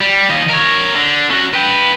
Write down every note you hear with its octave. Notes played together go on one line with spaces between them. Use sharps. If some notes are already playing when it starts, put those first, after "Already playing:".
G3
D#2 D#5
A#4 C#5
D3
C#4 F#4
B4 G5